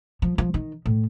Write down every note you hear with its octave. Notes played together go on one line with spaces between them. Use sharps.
F3
F3
D#3
A2